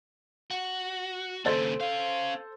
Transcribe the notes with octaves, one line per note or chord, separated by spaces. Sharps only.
F#4
D#2 C#3 A4 C5 A6
C#4 F5